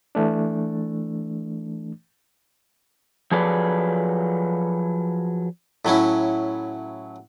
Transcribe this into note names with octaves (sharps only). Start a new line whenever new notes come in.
E3 A3 D4
F3 F#3 G#4 A4 B4 D5
A2 F#3 C#4 E4